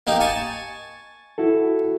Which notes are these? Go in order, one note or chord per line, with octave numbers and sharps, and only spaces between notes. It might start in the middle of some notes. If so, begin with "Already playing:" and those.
A#3 D#4 G4
G#5 A5 C#6
E4 F#4 A4